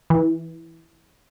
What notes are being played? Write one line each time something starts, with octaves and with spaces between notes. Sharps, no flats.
E3